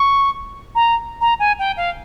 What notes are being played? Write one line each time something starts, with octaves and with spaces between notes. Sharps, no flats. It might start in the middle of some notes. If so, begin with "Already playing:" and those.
Already playing: C#6
A#5
A#5
G#5
G5
F5